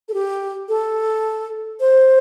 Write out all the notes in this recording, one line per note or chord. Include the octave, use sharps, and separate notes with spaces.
A4
G4
A4
C5